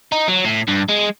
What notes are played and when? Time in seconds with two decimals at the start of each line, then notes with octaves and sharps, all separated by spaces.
0.12 D#4
0.28 F#3
0.45 A2
0.68 G2
0.89 G#3